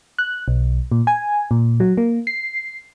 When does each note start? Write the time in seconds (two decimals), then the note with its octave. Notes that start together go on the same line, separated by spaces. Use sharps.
0.19 F#6
0.48 B1
0.92 A#2
1.07 G#5
1.51 A#2
1.80 F#3
1.97 A#3
2.27 C7